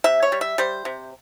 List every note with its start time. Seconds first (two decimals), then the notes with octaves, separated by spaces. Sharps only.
0.04 C3 E5
0.22 C#5
0.32 G3
0.41 E5
0.58 G3 C5
0.85 C3